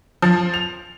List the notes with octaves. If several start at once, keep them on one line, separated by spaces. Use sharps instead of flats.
F3
F7